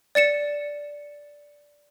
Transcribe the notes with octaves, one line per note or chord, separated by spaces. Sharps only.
D5 A6 C#7 E7